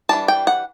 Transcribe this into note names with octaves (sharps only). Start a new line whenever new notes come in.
E3 G3 D4 A5
G5
F#5